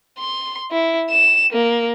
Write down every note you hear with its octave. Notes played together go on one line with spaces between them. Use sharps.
C6
E4
E7
A#3